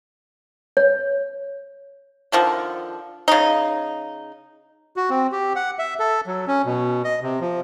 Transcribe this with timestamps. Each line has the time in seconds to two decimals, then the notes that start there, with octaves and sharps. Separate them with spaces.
0.77 C#5
2.32 D3 D#3 F3
3.28 C#3 D#4
4.96 F#4
5.10 C4
5.32 G4
5.56 F#5
5.79 E5
5.99 A4
6.27 F#3
6.48 C#4
6.65 B2
7.04 D#5
7.22 C3
7.41 F3